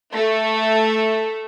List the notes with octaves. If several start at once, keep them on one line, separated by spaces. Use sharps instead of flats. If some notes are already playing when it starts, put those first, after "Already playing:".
A3